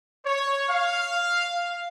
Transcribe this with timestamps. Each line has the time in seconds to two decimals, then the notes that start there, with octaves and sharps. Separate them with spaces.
0.24 C#5
0.69 F5